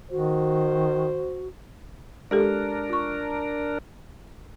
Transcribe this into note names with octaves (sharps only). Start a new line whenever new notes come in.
D#3 F#4 C5
G#3 D4 G4 A4 A#4
F4 C#6